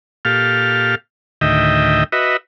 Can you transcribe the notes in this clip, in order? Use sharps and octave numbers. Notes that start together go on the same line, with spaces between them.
A#2 G4 A4 F5 F6
D2 A2 D#3 D#5 E5 G5
F#4 B4 D#5 E5